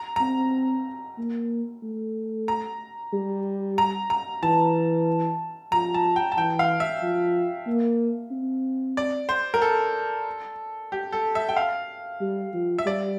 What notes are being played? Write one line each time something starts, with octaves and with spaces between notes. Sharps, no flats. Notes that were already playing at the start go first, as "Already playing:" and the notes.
Already playing: A#5
C4 A#5
A#3
A3
A#5
G3
A#5
A#5
E3 A5
F3 A#5
A5
G5
A5
E3 G5
F5
E5
F3
A#3
C4
D5
C5
A#4
A4
G4
A4
E5
G5
F5
G3
F3
E5
G3 D5